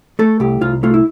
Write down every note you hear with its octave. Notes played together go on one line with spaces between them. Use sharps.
A3 A4
C2 G4
C2 F4
A3 F4
E4